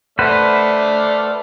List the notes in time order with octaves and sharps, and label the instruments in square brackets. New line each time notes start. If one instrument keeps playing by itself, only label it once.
[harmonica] A3 D5 F6 [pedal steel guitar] B4 C5 F#5